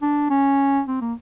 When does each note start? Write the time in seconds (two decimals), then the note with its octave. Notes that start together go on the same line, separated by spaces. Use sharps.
0.02 D4
0.30 C#4
0.87 C4
1.01 A#3